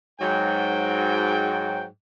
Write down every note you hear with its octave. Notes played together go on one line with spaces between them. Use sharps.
G#2 F#3 G5